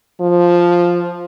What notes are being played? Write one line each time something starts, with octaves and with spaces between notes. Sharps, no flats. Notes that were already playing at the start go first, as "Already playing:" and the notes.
F3